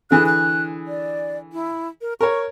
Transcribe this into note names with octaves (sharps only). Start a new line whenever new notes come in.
D3 E3 G#4 F#6
F#6
D5
E4
A#4
A#4 C#5 C#6